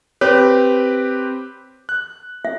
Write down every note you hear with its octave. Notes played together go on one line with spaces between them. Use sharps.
C4 G4 B4 C#5
F#6
E5